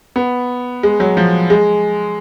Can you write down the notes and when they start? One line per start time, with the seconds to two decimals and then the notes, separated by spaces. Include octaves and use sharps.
0.16 B3
0.83 G#3
1.00 F#3
1.17 F3
1.50 G#3